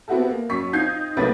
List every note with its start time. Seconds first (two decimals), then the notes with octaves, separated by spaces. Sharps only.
0.08 B3 C4 E4 F#4 G4 A4
0.29 A#3
0.49 F#2 C#6 B6
0.73 C4 D#4 F4 G6 G#6 C7
1.17 B1 C3 A3 A#3 B4 A6